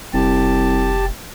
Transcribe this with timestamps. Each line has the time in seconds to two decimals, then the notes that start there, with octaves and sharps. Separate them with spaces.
0.14 F1 C2 G4 A5